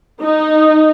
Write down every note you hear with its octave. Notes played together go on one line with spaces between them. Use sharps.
D#4